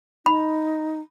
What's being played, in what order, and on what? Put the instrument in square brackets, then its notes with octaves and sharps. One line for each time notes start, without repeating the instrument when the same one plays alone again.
[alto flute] D#4 [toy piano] B5